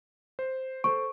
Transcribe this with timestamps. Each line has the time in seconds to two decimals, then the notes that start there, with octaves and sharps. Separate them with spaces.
0.39 C5
0.84 A4 C5 C#6 D7